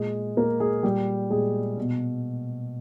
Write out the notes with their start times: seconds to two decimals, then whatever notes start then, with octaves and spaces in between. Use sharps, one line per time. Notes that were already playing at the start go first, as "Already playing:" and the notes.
Already playing: A#2 G#3 G#4
0.36 A#2 A#3 A#4
0.60 G#3 G#4
0.83 A#2 G3 G4
1.30 A#2 G#3 G#4
1.77 B2